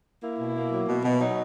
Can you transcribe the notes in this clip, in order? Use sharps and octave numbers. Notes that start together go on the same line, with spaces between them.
A#3 E4
B2
A#3
F#3
B2
B2
F#3 D#4